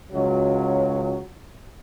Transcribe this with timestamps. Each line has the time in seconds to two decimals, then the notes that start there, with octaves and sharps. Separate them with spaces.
0.11 C#2 F#3